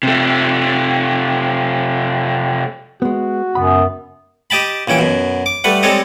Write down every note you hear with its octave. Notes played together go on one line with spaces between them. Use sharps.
C3 A3
G#3 B3 F#4
C#2 F#2 B3 B5
G4 D#5 G5 A5 B5
A#1 E3 C#4 G5
F#2 B2
D6
G3 A3 B4 F#5
G3 G#3 C4 A4 C#5 D#5